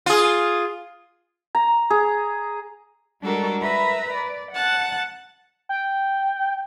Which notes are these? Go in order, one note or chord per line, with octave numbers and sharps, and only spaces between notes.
F4 G#4
A#5
G#4
G3 G#3 D4 F#4 A4 A#4
A#4 B4 E5 A#5 B5
D5
F#5 A5 F#6
G5